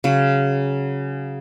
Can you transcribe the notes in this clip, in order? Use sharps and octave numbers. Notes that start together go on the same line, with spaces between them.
C#3 F#3